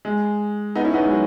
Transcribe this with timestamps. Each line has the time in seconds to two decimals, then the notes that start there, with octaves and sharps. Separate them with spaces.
0.05 G#3
0.75 B3 D#4
0.84 C#4 E4
0.94 B3 D#4
1.02 G#3
1.11 F#3